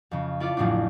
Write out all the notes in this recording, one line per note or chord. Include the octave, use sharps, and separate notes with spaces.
F2 C#3
E4 F4 A4 D5
A1 F2 A2 F3 F#3 D4